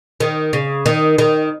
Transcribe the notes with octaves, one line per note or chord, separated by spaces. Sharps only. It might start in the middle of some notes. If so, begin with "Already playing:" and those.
D#3
C#3
D#3
D#3